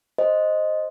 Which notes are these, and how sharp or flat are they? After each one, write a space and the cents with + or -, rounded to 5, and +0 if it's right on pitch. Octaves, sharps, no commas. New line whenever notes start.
C5 +0 D#5 +0